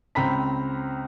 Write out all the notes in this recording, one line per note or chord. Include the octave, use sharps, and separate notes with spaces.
C#2 C4 C5 A#5 B5 B6